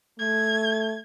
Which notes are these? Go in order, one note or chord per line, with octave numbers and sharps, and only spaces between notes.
A3 G#6